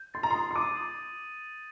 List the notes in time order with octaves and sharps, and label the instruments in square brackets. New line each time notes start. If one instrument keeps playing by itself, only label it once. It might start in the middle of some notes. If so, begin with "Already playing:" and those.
Already playing: [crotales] G6
[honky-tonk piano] C6 [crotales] A6
[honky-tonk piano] A#5
C6
[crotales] D#6
[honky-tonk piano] C6
[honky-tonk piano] D6 [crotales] D#7
[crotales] D#6